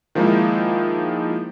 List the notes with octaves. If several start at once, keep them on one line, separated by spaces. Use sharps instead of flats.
D#3 F3 G#3 A#3 D#4 E4